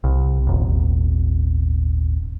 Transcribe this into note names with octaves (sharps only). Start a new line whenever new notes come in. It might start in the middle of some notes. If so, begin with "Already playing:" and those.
C2
D#1 G#1